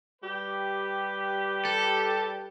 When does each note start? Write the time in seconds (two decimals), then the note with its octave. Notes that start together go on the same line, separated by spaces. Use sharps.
0.22 G3 G4 B4
1.65 A4